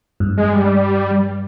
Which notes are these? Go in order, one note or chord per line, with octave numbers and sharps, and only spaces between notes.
G2
G#3
G3